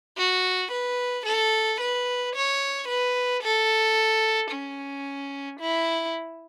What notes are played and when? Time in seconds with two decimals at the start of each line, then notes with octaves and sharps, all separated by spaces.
0.18 F#4
0.71 B4
1.26 A4
1.81 B4
2.35 C#5
2.88 B4
3.42 A4
4.52 C#4
5.60 E4